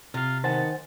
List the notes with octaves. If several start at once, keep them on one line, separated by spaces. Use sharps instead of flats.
C3 F4 F5
D#3 B3 C5 F#5 G#5 A5